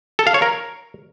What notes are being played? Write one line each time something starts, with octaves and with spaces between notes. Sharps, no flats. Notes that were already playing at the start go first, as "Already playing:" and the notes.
A4
F5
C#5
A#4